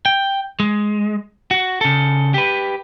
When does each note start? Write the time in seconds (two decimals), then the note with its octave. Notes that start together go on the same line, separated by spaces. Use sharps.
0.06 G5
0.60 G#3
1.51 F#4
1.81 C#3 A4
2.34 G4 B4